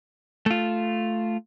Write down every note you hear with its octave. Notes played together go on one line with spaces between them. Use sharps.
A3 F4